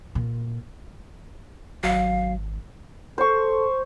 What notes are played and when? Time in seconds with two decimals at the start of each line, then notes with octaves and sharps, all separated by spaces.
0.15 A#2
1.84 G#1 F#3 F5
3.18 A4 C5 C#6